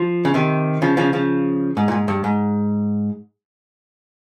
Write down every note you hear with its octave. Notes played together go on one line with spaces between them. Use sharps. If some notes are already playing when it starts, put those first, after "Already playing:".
Already playing: F3
C#3
C3 D#3
C#3 F3
C#3 F3
C#3 F3
G#2
A#2
G#2
G2
G#2